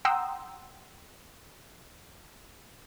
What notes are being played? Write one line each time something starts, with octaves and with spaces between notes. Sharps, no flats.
F#5 G5 A#5 C6 D#6 E6